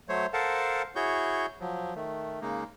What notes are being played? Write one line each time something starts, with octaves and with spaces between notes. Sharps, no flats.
F#3 A3 C5 C#5
A4 A#4 C5 F5 F#5 A5
E4 F#4 G#4 C#5 C#6 G6
F3 F#3
D#3 A3
C#3 G#3 A#3 D#4